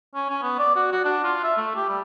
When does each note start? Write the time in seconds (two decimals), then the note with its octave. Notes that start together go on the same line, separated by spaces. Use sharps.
0.15 C#4
0.29 C#4
0.42 B3
0.59 D5
0.75 F#4
0.92 F#4
1.05 D4
1.24 F4
1.43 E5
1.57 A3
1.75 G4
1.89 G3